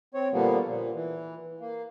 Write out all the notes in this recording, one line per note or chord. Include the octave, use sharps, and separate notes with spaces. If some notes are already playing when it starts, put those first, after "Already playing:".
C4 C#5
A#2 D3 F3 G3 A#3 B3
A#2
E3
A#3